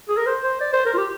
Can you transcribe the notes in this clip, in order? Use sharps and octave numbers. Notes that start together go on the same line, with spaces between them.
G#4
A#4
C5
C5
D5
C5
A#4
F4
G4